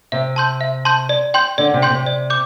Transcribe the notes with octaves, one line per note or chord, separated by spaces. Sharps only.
C3 E5
A5 C6 G6
E5
A5 C6 G6
D5
G5 C6 G6
D3 D5
C3
G5 C6 G6
C3
D5
D6 G6